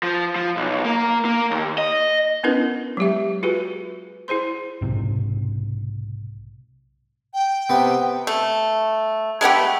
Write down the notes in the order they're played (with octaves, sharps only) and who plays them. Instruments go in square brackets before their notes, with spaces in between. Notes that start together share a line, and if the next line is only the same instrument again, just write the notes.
[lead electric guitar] F3
F3
B1
A#3
A#3
D#2
D#5
[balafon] B3 C#4 D4 E4 A#4 B4
F#3 G#3 G4 E5
F4 F#4 G#4 B4
E4 G#4 C5 C6
[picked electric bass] B1 G#2 C3
[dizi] G5
[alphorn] C3 [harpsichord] B3
[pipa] A3
G#3 A3 B3 G4